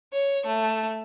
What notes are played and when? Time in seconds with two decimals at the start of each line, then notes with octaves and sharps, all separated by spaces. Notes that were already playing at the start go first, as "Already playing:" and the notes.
0.12 C#5
0.45 A3